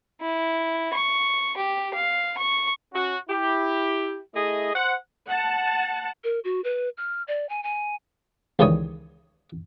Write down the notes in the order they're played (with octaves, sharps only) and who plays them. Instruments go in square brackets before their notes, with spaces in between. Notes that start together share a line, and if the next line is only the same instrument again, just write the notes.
[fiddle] E4
C#6
G4
F5
C#6
[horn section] C#4 F#4
E4 G4
A3 E4 G#4 D#5
C5 F#5
[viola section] F#5 A5
[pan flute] A#4
F#4
B4
F6
D5
G#5
G#5
[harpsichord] C#2 D#3 E3 G3 C#5 D#6